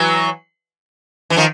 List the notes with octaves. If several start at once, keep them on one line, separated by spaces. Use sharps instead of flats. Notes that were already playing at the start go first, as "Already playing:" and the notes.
Already playing: E3 F#3
E3
D#3 F3